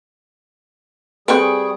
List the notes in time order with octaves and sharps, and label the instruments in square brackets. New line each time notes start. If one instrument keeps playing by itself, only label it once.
[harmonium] G3 G#4 [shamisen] C4 A4 B4 [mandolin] G5 C#6 F#6